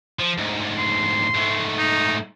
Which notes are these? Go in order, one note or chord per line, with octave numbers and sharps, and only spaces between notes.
F3
D2 G#2
C6
G#2 A3
D#4